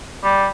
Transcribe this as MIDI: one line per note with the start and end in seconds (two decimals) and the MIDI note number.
0.23 0.47 55